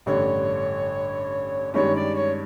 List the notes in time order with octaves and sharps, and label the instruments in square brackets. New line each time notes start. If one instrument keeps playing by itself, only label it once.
[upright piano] A1 G2 D3 [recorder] C#5
[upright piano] G2 D#3 G#3 C#4 [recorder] C#5
[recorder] D5
C#5